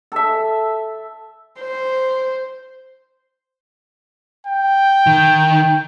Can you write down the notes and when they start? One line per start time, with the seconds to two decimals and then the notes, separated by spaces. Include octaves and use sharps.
0.12 A4 E5
1.60 C5
4.46 G5
5.07 D#3